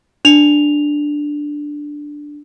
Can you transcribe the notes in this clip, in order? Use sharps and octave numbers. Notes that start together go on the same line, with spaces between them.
D4 F7